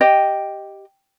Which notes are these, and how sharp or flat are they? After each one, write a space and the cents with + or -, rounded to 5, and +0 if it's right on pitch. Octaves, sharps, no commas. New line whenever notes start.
G4 +0 D#5 +0 G5 +0